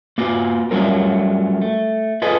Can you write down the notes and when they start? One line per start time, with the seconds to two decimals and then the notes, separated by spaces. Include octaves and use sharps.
0.18 A#3 F4 F#4
0.71 F#3 G3 A3 C#4 F4 A#4
1.61 A3
2.22 F4 G#4 A4 B4 D#5